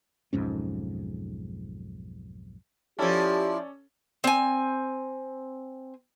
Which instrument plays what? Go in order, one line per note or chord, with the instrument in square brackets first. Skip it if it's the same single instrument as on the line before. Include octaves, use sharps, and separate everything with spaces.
[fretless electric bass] B1 F2 G#2 C#4
[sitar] F3 E4 [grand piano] C#4 A4 [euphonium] G4 [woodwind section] D5
[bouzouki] C4 G#5